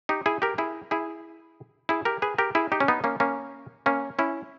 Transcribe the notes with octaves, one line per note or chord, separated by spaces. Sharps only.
D#4 G4
E4 G#4
G4 A#4
E4 G#4
E4 G#4
E4 G#4
G4 A#4
G#4 B4
G4 A#4
E4 G#4
D#4 G4
C#4
B3 D#4
A#3 C#4
A#3 C#4
A#3 C#4
C#4 E4